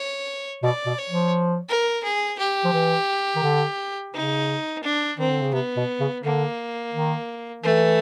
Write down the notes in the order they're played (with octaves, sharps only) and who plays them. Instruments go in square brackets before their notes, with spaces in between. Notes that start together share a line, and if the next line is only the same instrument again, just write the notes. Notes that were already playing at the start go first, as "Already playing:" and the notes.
Already playing: [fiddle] C#5
[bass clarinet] B2 [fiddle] D5
[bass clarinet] B2
[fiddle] C#5
[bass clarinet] F3
[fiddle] A#4
G#4
G4
[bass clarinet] F3
E3
D#3
D3
[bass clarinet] C#3 [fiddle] D#4
[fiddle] D4
[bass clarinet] D#3 [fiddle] C4
[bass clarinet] D3
C#3
[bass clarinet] C3 [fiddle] B3
[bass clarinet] B2
C#3
[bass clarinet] D3 [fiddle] A#3
[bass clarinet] D#3
[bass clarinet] E3 [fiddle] A3